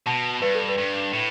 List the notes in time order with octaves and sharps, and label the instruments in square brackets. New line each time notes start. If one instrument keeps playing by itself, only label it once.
[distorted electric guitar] B2 [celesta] A5
[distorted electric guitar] G2 [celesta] B4
[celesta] A4
B4
[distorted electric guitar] G2
A2